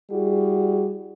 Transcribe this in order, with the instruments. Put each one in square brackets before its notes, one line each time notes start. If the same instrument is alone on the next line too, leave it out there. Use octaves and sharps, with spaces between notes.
[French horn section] G3 E4 F#4 G#4